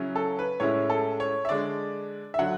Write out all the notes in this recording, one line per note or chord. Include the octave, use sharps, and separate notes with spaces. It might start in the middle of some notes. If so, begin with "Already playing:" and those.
Already playing: C#3 F#3 C#4 E4
A4
B4
A2 G#3 C#4 E4 C#5
A4
C#5
E5
D3 G#3 D4 D5
E5
D3 F#3 F#5